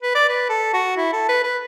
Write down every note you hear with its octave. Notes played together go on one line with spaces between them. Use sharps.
B4
D5
B4
A4
F#4
E4
A4
B4
B4